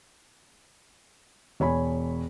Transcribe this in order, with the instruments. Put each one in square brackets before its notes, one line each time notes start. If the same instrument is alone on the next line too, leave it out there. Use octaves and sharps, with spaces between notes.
[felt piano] E1 C#5 G#5 B5